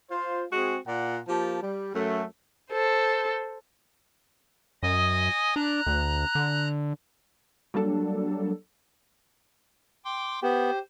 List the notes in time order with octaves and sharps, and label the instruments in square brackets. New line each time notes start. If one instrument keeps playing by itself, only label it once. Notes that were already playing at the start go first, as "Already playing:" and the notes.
[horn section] F4 C5
G#3 C4 F#4 G#4
A#2 F4 D5 F#5
F3 A#3 G4 A5
G3
F#2 A3
[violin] A4 C5
[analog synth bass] F#2 [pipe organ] D#5 G#5 D#6
[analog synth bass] D4 [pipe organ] A#5 F#6
[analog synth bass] D2
D3
[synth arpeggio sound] F#3 G3 A#3 D4 A4
[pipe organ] G5 C6 D6
[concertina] B3 [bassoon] G4 [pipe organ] C5